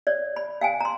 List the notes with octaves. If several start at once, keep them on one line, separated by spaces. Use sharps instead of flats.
C#5 D5
B5
F5 G5 G#5
A#5 C6